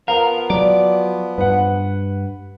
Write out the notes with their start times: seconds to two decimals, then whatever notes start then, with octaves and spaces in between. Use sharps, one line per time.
0.08 F3 B3 A#4 F5
0.50 F#3 D5 D7
1.38 G2 B4 F#5